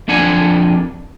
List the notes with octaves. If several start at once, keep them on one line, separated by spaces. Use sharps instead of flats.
F2 D4 F#5 G#5